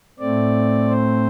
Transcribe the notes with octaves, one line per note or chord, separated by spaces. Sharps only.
A2 A3 C4 D5
C5